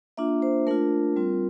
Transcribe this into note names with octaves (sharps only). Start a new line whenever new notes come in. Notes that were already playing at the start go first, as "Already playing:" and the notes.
A#3 D4 F4 E5
C5
A3 D4 F4 A#4
G3 C4 F4